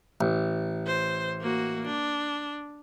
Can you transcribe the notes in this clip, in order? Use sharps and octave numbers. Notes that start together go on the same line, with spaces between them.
A1
C5
A#3 F#4
D4